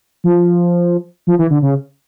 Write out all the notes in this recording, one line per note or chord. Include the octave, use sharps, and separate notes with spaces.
F3
F3
E3
D3
C#3